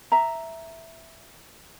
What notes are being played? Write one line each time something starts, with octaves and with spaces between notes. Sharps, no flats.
E5 A#5